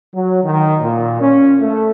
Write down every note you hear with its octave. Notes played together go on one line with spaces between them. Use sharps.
F#3
D#3
A#2
C#4
A3